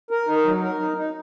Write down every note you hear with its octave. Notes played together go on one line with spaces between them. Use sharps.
A#4
D#4
F#3
A#4
D#4
D#4